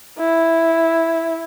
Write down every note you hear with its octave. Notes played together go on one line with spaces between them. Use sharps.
E4